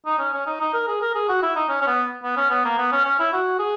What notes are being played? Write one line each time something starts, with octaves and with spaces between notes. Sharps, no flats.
D#4
C#4
C#4
D#4
D#4
A#4
G#4
A#4
G#4
F#4
E4
D#4
C#4
C#4
B3
B3
C#4
B3
A#3
B3
C#4
C#4
E4
F#4
G#4